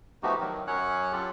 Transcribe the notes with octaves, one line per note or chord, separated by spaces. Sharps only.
F3 A3 B3 D#4 F#4 G4
D#3 F#3
F#2 F#3 C#4 C#5 F#5 F#6
F#3 F4 G4 A4